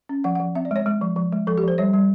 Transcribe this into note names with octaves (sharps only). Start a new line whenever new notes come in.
C#4
F3 F#5
F#5
F3
C4 E5
D5
G#3 C#5
G#3
F3
F3
G#3
F3 A4
G4
F3 C5
G3 C#5
G3